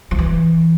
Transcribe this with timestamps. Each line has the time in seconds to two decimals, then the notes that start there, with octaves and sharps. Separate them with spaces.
0.11 F3
0.19 E3